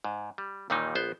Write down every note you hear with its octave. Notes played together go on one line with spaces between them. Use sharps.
G#2
G3
D#2 A#2 D#3 E3 G3 D#4
A#1 B3 C5